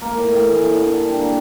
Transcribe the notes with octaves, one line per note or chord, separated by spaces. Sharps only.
A#3 A#4
A2
A2
E3
A#3
D3
D3
G3
A#3 A#4